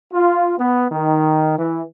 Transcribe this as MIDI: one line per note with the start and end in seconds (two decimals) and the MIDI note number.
0.13 0.53 65
0.57 0.86 59
0.92 1.55 51
1.57 1.82 52